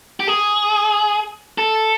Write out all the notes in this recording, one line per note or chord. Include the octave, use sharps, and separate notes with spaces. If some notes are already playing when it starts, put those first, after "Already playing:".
G4
G#4
A4